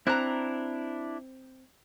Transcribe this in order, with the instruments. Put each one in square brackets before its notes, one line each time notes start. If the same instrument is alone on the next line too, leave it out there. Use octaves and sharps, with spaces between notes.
[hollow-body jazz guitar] C4 [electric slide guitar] D4 E4 [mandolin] A#5 F#6